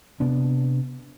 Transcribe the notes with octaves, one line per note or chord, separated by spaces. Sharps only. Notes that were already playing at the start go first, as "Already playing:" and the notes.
C3 B3 D4